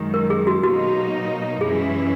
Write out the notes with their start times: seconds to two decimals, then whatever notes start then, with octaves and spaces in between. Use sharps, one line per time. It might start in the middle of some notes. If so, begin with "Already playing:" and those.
Already playing: F#2 D#3 G#3
0.14 A#4
0.30 G#4
0.47 F#4
0.63 B2 F#3 A#3 D#4 F#4
1.61 F#2 E3 G#3 C#4 E4 G#4